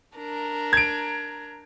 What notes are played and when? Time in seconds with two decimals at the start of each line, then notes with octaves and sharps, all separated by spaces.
0.16 D4 A#4 A#5
0.73 G#6 D7